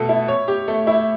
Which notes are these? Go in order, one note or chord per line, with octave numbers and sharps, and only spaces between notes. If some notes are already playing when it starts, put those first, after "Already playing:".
Already playing: B2 A3 A4
E4
C#5
G4
A3
E4